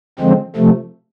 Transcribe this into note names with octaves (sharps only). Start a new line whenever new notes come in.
D3 F3 G#3 C4
C3 F3 A3